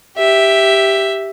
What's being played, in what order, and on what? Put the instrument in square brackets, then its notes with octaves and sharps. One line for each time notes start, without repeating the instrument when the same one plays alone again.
[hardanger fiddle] G4 E5